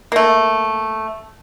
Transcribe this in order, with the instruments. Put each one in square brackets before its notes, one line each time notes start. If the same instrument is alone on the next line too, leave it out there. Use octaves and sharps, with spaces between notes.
[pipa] A3 A#3